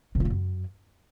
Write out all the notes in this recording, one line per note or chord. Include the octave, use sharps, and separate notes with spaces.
C3
F3
A#2
F#2